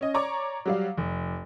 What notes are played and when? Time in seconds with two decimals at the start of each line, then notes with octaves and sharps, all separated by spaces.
0.01 C#4 D#5
0.14 C#5 D5 A#5 C#6 D6
0.66 F#3 G3 F5
0.98 F1